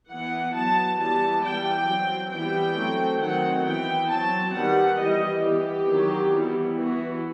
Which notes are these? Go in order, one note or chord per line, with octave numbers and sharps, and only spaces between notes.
E3 B3 F#5
F#3 B3 A5
E3 G3 B3 A5
E3 G3 B3 G5
F#3 C4
E3 G3 B3 G5
F#3 A3 C4
D#3 F#3 C4 F#5
E3 B3 G5
F#3 C4 A5
D#3 G3 B3 F#5
E3 G3 B3 D#5
E3 B3 G4
D#3 F#3 C4
E3 G3 B3
E3 B3 F#4